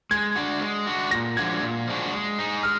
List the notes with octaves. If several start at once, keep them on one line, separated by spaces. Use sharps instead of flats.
G#3 G#6
D4 F#4
G#3
D4 F#4
A#2 A#6
F3 G#3 D4 F#4 G#6
A#2
F3 G#3 D4 F#4
G#3
D#4 G#4
G#3 F6